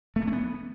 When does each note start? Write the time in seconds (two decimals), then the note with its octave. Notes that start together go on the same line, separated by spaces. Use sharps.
0.16 A3
0.22 A#3
0.27 C#4
0.33 B3